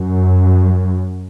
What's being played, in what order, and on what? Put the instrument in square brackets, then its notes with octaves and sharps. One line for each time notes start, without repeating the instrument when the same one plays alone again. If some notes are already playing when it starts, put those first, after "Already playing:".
Already playing: [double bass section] F#2